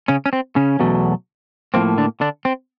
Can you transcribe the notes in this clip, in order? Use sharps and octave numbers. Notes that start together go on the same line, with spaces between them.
C#3 C#4
C#4
C4
C#3 C#4
E2 B2 F#3 A3
A2 F3 A#3 C4
D3 D4
D3 D4
C4